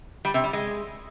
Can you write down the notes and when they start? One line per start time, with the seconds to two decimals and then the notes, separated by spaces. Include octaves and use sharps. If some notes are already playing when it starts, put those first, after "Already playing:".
0.25 G3
0.34 C3
0.44 G3
0.53 G#3